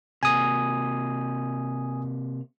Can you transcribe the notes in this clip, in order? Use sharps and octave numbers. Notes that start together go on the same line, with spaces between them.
C3 A#3 G#5 D#6